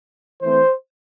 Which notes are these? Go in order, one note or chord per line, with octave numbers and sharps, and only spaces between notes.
E3 A3 C4 C5